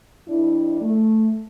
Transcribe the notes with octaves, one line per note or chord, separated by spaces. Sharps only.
F2 D4 E4
A3